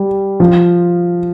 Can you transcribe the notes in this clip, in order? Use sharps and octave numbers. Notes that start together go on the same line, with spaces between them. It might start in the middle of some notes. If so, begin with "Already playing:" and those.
Already playing: G3
F3